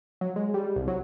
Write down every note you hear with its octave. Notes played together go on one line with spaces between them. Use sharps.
F#3
G#3
G3
C2
F#3